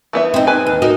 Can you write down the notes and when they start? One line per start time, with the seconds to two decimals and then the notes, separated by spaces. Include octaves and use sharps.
0.13 E3 B3 E5
0.34 C4 D#4
0.47 B4 G#5
0.67 D#2
0.82 D#4 F#4 A#4